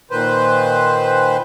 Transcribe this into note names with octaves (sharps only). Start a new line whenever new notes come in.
A#2 D#3 B4 C5